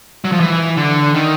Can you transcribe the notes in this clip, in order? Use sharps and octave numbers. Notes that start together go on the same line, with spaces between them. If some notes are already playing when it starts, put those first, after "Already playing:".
F#3
F3
E3
D3
D#3